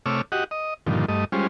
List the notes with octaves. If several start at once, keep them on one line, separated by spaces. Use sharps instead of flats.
C3 A3 C#5 D6 E6 F6
F#4 G4 D#5 F#5
D#5
G2 A#2 D3 D#3 F3
G2 A3 D#5
G3 G#3 C#4 F4 C5